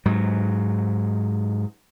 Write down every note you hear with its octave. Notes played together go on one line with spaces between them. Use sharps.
G#2 F#3